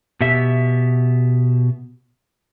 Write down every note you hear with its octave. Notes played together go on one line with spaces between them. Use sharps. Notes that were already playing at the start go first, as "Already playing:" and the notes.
B2 G4 E5